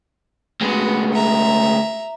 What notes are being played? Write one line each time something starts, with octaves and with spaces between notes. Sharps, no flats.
D2 G#3 B3 F#4
E5 A#5